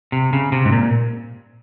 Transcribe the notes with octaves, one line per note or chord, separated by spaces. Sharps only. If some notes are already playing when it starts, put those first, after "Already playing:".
C3
C#3
C3
G#2
A#2